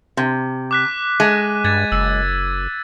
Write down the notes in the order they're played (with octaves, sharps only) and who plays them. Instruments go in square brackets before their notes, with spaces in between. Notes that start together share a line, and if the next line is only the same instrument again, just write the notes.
[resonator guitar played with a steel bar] C3
[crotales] D6 F#6 B6
[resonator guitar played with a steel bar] G#3 [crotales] D#7
[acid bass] G2 [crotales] G#6 A6
[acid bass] F#1 [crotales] E6